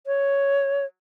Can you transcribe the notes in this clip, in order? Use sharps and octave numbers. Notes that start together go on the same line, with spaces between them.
C#5